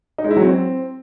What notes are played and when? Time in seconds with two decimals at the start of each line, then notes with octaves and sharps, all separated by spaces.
0.18 D#4
0.24 G#3
0.31 E4
0.37 F#3
0.43 C4